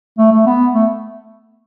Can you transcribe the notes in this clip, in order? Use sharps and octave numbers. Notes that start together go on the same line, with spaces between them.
A3
A3
B3
A3